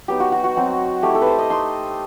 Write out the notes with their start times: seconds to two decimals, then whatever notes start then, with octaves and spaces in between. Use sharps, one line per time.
0.08 F#3 B3 D#4 G4
0.20 F#4
0.32 F#4
0.44 F#4
0.56 F#3 C4 D#4
1.03 A3 E4 G4
1.15 A4
1.21 B4
1.27 C5
1.38 D#5
1.50 A3 D#4 C6